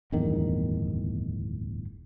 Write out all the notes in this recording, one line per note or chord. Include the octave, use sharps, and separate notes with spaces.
D1 G1 E2 D#3